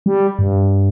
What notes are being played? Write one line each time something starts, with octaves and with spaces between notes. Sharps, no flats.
G3
G2